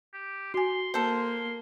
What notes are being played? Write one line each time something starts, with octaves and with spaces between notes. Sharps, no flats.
G4
F#4 G#5 C6
A#3 A4 C5 C6